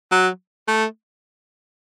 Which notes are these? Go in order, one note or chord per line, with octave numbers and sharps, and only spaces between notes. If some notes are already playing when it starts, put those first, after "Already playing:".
F#3
A3